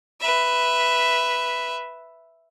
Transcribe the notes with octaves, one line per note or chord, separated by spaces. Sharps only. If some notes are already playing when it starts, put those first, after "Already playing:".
B4 E5